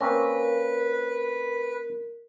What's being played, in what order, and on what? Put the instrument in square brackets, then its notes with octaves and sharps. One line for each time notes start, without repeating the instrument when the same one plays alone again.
[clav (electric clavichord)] A#3 C4 C#4 [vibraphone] A#4 [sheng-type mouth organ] B4